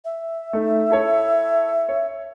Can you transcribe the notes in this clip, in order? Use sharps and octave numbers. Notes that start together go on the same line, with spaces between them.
E5
A3 D#4
E4 A4 C#5
C#5